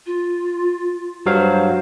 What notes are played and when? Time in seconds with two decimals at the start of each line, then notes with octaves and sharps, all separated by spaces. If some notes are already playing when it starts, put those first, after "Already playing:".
0.06 F4
1.26 G2 F#3 C5 F5